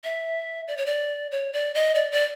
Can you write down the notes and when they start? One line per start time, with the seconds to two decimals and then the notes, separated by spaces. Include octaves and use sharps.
0.04 E5
0.68 D5
0.77 C#5
0.86 D5
1.32 C#5
1.53 D5
1.75 D#5
1.95 D5
2.12 D5